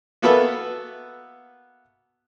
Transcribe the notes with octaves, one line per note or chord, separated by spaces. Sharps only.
A#3 B3 F#4 A4 B4 E5